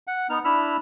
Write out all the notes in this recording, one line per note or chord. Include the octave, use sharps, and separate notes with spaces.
F#5
B3 D#4 F6
D4 E4 B5 E6 F6